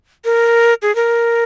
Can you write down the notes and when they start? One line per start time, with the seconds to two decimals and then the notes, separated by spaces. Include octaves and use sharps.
0.25 A#4
0.82 G#4
0.95 A#4